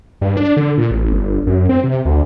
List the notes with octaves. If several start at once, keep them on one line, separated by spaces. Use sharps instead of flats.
G2
D4
D3
A#2
A1
G1
F#2
C4
C3
D2